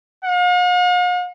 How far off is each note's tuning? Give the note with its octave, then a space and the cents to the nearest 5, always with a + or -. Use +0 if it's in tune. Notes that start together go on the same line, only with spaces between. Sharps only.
F5 +45